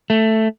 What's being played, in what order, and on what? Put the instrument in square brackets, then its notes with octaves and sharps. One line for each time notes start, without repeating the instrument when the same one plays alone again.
[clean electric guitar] A3